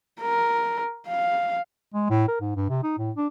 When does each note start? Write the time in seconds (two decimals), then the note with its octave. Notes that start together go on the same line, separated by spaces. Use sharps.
0.21 A#4
1.08 F5
1.94 G#3
2.10 A2
2.28 A#4
2.41 G#2
2.56 G2
2.69 C3
2.83 D#4
2.98 A2
3.17 D4